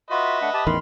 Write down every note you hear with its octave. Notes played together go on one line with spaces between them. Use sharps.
F4 F#4 B4 D#5 E5
A3 D4 F#5
G4 A5 D#6
A1 E2 D#3 B5 C6 F6